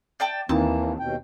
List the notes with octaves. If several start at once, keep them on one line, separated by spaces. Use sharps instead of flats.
D5 G5 A5
D#2 E3 A#3 C4 D#4 E4 A5
D#2 B2 G5